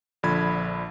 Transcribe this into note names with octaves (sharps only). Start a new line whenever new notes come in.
A#1 D3 F3 B5 G#6